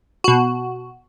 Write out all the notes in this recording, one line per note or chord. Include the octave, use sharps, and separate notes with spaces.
B2 F#4